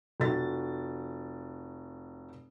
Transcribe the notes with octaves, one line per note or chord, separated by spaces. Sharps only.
F1 F#4 A6